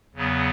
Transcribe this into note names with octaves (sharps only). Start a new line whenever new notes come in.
E2 C#3 F#3 B3